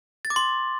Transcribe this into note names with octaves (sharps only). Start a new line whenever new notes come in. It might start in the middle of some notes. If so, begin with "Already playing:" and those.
A6
D6
C6